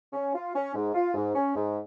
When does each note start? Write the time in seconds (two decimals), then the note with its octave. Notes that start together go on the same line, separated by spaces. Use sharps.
0.13 C#4
0.34 F4
0.55 C#4
0.74 G#2
0.94 F4
1.14 G#2
1.35 C#4
1.55 G#2